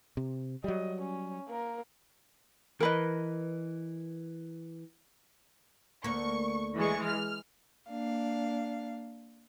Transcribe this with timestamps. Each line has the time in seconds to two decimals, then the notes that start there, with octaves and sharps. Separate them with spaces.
0.17 C3
0.64 F#3 G3 D#5
1.02 C#4
1.48 A#3 A#4
2.80 E3 A#4 B4 D#5
6.04 D2 A#3 C#6
6.76 E3 G#3 C#6
7.05 F6
7.89 A#3 D4 F5